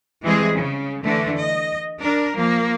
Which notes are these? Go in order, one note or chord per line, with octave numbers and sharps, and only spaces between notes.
E3 G3 G#3 C4 E4 G#4
C#3
D3 E3 A3 D4
D#5
D4 A#4
F3 A#3